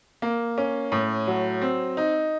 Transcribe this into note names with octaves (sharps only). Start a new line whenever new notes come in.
A#3
C#4
A2
F#3
C4
D#4